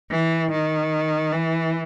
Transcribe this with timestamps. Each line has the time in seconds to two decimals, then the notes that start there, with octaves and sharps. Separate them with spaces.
0.11 E3
0.52 D#3
1.33 E3